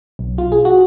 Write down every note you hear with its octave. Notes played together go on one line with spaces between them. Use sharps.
B1
F4
G#4
F#4